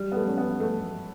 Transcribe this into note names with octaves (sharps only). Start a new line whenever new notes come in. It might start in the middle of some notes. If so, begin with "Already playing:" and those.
Already playing: G3
B3
A3
C#4
B3
A3